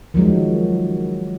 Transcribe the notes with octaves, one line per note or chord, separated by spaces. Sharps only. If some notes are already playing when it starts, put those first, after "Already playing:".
D#3 F3 F#3 G#3